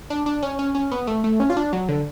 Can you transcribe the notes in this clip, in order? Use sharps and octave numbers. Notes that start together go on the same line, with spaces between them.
D4
D4
C#4
C#4
C#4
B3
A3
A3
C#4
F4
D4
F#3
D3